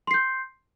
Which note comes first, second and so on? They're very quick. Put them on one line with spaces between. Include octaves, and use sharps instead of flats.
C6 C7 G6